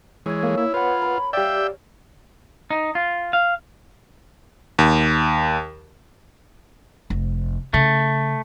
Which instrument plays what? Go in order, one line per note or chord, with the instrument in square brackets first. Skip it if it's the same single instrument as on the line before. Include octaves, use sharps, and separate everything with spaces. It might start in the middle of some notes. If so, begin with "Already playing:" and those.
[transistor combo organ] E3 G#3 [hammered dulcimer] C#5 G#5
[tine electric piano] A#3 [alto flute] A4
[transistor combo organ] E4
[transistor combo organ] F4 [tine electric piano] B4 F#5 [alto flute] B5
[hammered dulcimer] A#4
[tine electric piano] G4 D5 [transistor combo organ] E5 G5 [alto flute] F5
[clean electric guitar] D#4
F4
F5
[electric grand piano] D#2
[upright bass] F1
[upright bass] C#3 [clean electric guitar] A3